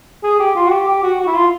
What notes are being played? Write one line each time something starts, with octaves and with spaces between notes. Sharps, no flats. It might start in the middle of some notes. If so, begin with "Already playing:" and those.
G#4
G4
F4
F#4
G4
G4
F#4
F#4
E4
F4